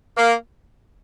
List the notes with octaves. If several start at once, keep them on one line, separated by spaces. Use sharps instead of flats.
A#3